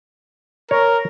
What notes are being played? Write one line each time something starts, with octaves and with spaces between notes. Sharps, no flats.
A#4 C#5